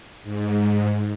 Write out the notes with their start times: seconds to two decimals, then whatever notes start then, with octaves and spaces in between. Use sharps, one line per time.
0.23 G#2